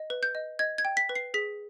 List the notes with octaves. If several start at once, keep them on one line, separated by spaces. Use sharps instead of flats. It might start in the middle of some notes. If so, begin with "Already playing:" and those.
Already playing: D#5
B4
G6
D#5
D#5 G#6
G#6
G5
B6
B4
C7
G#4 B6